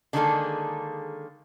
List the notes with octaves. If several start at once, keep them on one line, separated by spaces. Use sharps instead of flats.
D3 D#3 G#3 A#3 G#4 A4